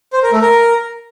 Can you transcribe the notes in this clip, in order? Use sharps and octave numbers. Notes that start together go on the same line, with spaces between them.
C5
A#4
A3
A#4